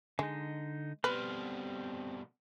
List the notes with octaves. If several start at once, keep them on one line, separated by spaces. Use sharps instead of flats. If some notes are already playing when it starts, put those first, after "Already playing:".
D3 G#3 D#4
B2 G3 C4 B4 C6 F6